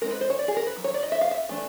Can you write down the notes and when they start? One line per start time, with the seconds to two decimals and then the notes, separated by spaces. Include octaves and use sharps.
0.02 G#3 C4 D#4 A#4
0.11 B4
0.21 C5
0.30 C#5
0.39 D5
0.48 G#4
0.57 A#4
0.67 B4
0.76 D#3 F#3
0.84 C#5
0.94 D5
1.03 D#5
1.12 E5
1.21 F5
1.31 E5
1.49 E3 A3 D4